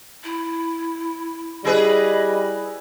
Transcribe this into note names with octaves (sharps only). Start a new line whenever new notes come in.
E4
G3 E4 G#4 B4 D#5